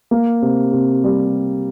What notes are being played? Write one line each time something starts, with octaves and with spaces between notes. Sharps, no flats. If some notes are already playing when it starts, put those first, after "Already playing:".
A#3
C3
C3
G3